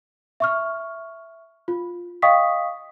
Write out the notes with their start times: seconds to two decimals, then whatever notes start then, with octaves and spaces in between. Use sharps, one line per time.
0.40 E5 C#6 F6
1.68 F4
2.22 D#5 F5 G5 C#6 D#6 B6